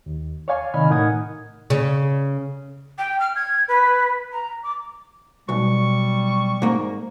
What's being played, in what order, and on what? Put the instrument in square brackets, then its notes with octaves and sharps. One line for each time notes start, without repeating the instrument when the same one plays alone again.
[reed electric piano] D#2
C#5 D5 F5 G#5 C#6
C3 D#3 D#5 G#5 B5 F6
A2 D#4 A#4 F#5 D#6 G#6
[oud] C#3
[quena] G5
F6
G#6
B4
A#5
D6
[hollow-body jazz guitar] B1 [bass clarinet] G3 [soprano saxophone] C#6
[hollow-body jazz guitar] G#2 A#3